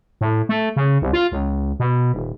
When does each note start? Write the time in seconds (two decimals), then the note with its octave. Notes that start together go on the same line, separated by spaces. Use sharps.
0.21 A2
0.49 A3
0.76 C#3
1.02 C2
1.13 F4
1.32 C#2
1.80 B2
2.14 D#1